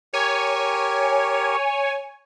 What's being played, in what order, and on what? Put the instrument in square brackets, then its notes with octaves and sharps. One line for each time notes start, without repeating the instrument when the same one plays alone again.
[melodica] G4 A#4 [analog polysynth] C#5 G#5